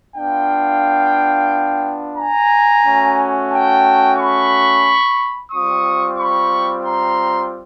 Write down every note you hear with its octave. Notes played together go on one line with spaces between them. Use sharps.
B3 D4 F4 F5 G5
G#5 A#5
A3 C#4 F#4
G5 A5
B5 C#6
G3 C4 F4 C#6 D#6
B5 C#6
A#5 C6